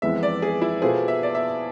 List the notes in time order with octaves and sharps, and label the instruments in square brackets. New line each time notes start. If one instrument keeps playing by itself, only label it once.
[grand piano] F2 E3 G#3 B3 [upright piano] E5
[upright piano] D5
G#4
E4
[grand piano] B2 B3 F4 A4 C5 [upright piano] G#4
[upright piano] E5
D5
E5